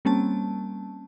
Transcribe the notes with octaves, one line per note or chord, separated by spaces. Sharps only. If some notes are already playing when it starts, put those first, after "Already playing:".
G3 A#3 C4 C#4 A5